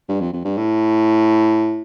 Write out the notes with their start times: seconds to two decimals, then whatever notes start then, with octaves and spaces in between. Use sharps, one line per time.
0.09 G2
0.21 F2
0.33 F2
0.45 G2
0.58 A2